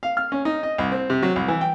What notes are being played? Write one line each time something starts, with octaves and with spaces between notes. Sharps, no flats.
F5
F6
C#4
D#4
D#5
C2
C4
C3
F#3
C2
E3
G5